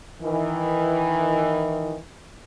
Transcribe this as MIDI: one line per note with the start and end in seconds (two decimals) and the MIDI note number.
0.22 1.97 51
0.22 1.97 52